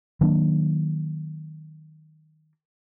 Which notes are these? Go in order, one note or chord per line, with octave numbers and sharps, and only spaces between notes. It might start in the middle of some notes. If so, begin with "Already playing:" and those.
D#3 F#3 A#3 D4